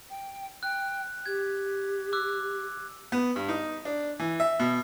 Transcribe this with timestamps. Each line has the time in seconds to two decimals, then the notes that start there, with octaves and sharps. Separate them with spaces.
0.10 G5
0.63 G5 F#6
1.26 G4 G#6
2.13 D6 E6 F#6
3.12 B3
3.36 G2
3.49 D#4
3.85 D4
4.19 E3
4.40 E5
4.60 B2